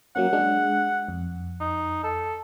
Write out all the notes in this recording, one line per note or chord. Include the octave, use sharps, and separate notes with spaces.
F#3 A#3 C#4 F#5
G#3 D4
F2
D#4
A4